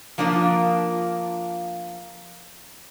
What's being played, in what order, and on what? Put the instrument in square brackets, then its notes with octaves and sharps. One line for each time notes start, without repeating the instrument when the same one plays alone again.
[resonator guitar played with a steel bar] F3 A#3 D4 F4